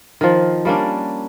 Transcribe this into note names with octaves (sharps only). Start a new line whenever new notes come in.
D#3 F3
G3 A#3 C#4 D4